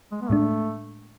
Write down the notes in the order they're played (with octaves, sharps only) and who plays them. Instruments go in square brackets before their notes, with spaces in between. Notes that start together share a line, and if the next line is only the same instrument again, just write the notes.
[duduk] G#3
B3
[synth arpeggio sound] A2 G#3 D4 [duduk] A3